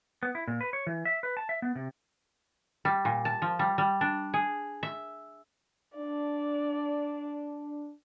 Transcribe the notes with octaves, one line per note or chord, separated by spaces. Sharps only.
B3
E4
A#2
B4
C#5
E3
E5
B4
A5
E5
B3
C3
G3
A#2
A5
F3
G3
G3
D4
G#4
E5
D4 D5